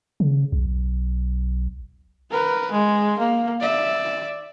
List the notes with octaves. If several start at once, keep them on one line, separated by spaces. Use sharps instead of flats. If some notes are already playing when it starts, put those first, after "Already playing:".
C#3
B1
A#4 B4
G#3
A#3
D5 E5